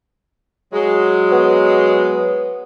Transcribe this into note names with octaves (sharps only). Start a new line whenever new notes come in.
F#3 G#3
B3